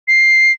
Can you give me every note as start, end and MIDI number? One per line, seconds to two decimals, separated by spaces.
0.08 0.52 96